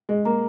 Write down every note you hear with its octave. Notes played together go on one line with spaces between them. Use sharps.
G#3 G#4
A#3 A#5